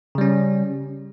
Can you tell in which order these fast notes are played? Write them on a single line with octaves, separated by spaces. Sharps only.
C#3 G3 C#4